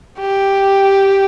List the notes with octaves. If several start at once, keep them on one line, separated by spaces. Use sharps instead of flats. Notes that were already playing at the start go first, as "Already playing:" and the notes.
G4